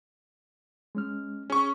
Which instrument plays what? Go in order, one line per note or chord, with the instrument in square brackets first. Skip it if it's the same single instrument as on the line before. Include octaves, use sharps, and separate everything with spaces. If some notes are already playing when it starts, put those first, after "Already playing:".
[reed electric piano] G#3 C#4 F6
[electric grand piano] C#4 C#6 [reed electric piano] G#4